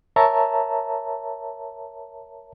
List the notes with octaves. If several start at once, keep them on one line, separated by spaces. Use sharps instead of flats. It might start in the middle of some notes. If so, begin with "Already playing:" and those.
A#4 C#5 E5 A5 A#5